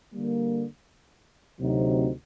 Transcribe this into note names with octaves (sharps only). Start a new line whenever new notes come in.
D3 G3 A#3
D2 C3 F#3 C4 D#4